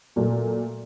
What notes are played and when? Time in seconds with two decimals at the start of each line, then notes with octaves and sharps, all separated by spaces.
0.16 A#2 F#3 A3